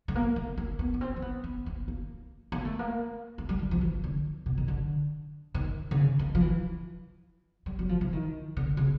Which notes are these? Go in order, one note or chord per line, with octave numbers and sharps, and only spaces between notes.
A3
A#3
A3
A#3
B3
B3
C4
C4
B3
B3
A#3
A#3
A#3
A3
A#3
A3
G3
G3
F3
E3
D3
B2
D#3
D3
D#3
D3
C#3
D#3
F3
E3
G3
F#3
F3
E3
D#3
D3
C#3